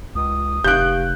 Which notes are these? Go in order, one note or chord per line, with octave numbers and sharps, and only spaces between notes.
C#2 D#6
F1 G4 F5 F#6 G6 D7